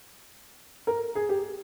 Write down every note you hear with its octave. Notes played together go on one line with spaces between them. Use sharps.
A#4
G#4
G4